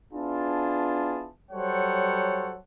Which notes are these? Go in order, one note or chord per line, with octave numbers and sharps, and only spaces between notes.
B3 D4 E4 F4 G#4 A5
F#3 G3 A4 C5 C#5 F#5